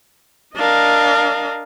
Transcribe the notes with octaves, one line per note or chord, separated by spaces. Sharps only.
D4 A#4 D#5 F5